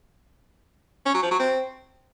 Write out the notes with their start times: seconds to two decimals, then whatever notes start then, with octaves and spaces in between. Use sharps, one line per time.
1.06 C#4
1.14 F#3
1.23 F3
1.31 F#3
1.39 C4